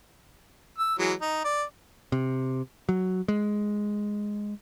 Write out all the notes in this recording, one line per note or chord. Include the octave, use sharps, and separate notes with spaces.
E6
E3 F#3 G#3
D#4
D5
C3
F#3
G#3